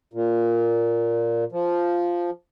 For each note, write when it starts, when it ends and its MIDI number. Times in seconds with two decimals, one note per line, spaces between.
0.13 1.44 46
1.52 2.30 53